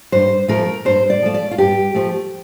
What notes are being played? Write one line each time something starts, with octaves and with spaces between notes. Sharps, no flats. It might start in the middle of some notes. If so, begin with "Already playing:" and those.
G2 C5
F3 A3 A#4
G2 C5
D5
F3 A3
D5
F4
G2 G4
F3 A3